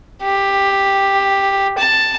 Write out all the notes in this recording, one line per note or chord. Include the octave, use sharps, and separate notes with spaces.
G4
A5